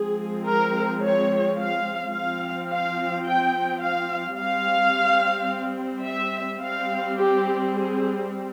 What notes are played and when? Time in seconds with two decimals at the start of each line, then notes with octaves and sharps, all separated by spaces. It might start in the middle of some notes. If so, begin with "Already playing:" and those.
Already playing: F3 G#3 C4 G#4
0.46 A#4
1.02 C#5
1.58 F5
2.13 F3 C4 F5
2.69 F5
3.26 G5
3.81 F5
4.37 G3 C4 F5
6.04 E5
6.60 G3 C4 F5
7.15 G4
7.72 G#4